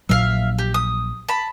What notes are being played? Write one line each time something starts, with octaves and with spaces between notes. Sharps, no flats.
A#1 A#2 F#3 E5 F5
G4
D#6
A5 B5